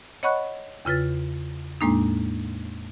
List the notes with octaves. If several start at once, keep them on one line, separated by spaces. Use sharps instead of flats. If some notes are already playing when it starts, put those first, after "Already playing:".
C#5 D#5 F#5 B5 C#6 F#6
E2 C#3 F4 B4 A6
E2 A2 G#3 A#3 D4 D#4